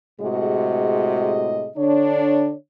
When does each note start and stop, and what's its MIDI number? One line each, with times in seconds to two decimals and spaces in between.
0.21 1.69 45
0.21 1.69 48
0.21 1.69 56
0.21 1.69 66
0.21 1.69 68
0.21 1.69 75
1.77 2.53 50
1.77 2.53 62
1.77 2.53 73